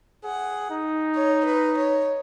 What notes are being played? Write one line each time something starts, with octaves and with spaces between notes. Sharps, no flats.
G#4 F#5
D#4
C#5
B4
C#5